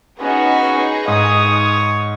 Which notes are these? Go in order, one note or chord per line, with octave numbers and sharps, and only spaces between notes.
B3 C#4 D#4 F#4 G#4 B4
G#2 C#5 D#6